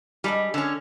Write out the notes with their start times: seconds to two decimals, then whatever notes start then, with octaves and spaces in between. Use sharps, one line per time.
0.24 G3 G#3 D4 D#5
0.54 D3 C#4